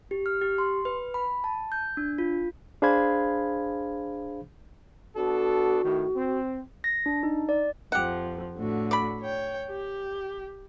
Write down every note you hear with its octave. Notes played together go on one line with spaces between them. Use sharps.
G4
F6
G4
C6
B4
B5
A5
G6
D4
F4
D4 G#4 C5 F5 B5 G#6
B3 D4 F#4 A4
A2 D#3
C4
A#6
D4
D#4
D5
F2 F3 G4 F#5
A2 D3 F#4
D5 B5
C#5 G5
G4